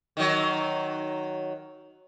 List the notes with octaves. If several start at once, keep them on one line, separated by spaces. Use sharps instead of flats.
D#3 F#3